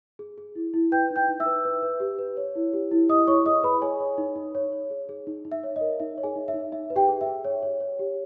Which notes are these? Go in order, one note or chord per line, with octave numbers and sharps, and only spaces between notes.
G#4
G#4
E4
E4
B4 G5 G6
D#4
G5 G6
D#4
E5 E6
B4
B4
B4
G4
B4
C#5
E4
G4
E4
E4 D#5 D#6
E4 C#5 C#6
G#4 D#5 D#6
G#4 B4 B5
G#4 C#5 G#5
C#5
D#4
D#4
C#5
C#5
G#4
G#4
D#4
D#4
E5
C#5
D#5
A#4
D#4 E5
C#5
G#4 G#5
D#4
E5
D#4
D#4 E5
B4
G4 G5
G#4
E5
G#4
C#5
C#5
C#5
G4